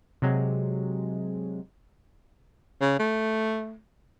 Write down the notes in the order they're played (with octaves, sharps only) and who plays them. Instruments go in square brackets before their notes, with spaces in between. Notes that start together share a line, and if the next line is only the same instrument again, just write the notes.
[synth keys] C3 F#3 G#3
[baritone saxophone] C#3
A3